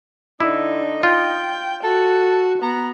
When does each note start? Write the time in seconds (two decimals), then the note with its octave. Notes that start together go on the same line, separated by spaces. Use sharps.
0.40 D3 D#4 E4
1.03 F4 G5
1.84 F#4 A4
2.62 B3 A#5